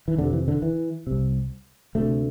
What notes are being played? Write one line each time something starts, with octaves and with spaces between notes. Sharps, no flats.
E3
F2 C3 D3
E3
D3
E3
C2 C3
D2 C3 A3